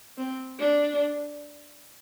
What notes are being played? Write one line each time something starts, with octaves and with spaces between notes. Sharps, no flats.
C4
D4